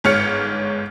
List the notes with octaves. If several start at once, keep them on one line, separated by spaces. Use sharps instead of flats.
G1 G#2 C#5 F6 C#7